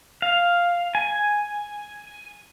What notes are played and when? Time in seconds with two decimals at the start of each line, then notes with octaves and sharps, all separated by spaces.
0.22 F5
0.95 G#5